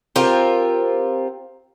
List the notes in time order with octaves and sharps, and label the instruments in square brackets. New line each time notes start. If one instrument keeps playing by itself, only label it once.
[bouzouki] C4 F4 G4 A#4